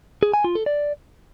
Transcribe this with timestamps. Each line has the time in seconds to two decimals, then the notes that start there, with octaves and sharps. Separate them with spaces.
0.23 G#4
0.34 G#5
0.44 F4
0.55 A4
0.66 D5